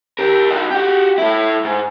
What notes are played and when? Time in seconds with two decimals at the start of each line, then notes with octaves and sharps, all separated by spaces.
0.19 G4 A#4
0.50 D#4 F#4
0.71 F#4 G4
1.18 A3 E4
1.65 G#2